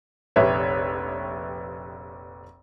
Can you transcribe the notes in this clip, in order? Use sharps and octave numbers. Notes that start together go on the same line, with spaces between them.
F1 A#1 G4 B4 C#5 E5